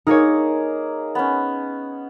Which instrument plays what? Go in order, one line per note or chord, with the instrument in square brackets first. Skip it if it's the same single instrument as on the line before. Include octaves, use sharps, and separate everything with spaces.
[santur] A#3 G#4 A#4 [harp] D#4 C#5
[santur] B3 C#4